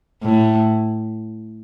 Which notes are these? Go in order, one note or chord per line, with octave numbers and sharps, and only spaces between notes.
A2